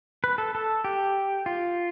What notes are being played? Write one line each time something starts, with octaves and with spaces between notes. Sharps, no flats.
B4
A4
A4
G4
F4